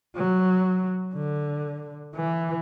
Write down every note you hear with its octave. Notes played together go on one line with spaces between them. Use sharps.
F#3
D3
E3